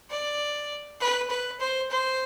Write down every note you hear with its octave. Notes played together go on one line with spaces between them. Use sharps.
D5
B4
B4
C5
C5